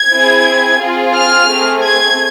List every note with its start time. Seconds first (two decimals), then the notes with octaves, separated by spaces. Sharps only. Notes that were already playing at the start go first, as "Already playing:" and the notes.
Already playing: G#6
0.10 C4 E4 G#4
0.80 C4 F4 G#4
1.14 F6
1.49 A3 C4 G#4
1.83 G#6